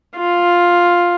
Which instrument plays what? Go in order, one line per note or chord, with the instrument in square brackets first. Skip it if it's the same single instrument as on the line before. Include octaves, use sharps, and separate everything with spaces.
[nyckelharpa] F4